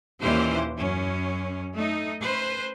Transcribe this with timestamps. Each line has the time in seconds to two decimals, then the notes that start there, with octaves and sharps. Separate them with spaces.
0.21 D#2 A#2 E3 C#4 G4 C5
0.77 F#2 C#4
1.75 A3 D#4
2.21 C#4 B4 C5